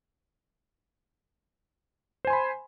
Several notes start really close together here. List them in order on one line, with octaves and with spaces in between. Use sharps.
C5 G#5 C6 B5